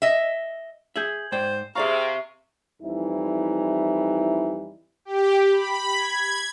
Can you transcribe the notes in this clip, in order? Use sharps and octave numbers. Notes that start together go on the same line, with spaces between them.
D#5 E5
G#4 E5 G6 G#6 F#7
G#2 C5 D5 G5
C3 G#4 D5 E5 F5 A#5 C#6
F2 E3 G3 D#4 E4
G4
B5
G#6